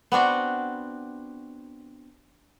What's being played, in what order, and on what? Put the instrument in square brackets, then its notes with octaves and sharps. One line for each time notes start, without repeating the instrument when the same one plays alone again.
[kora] B3 C4 D4 F#4